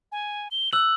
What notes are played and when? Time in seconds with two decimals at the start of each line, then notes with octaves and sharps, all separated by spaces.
0.12 G#5
0.51 G7
0.73 E6 F#6 F#7